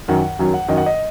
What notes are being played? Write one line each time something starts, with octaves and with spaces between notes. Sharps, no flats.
F#2 D#3 F#3 F#5
F#2 D#3 F#3
F#5
F#2 D#3 F#3 D#5
F#5
D#5